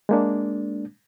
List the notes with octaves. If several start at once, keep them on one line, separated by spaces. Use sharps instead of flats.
G#3 A#3 D4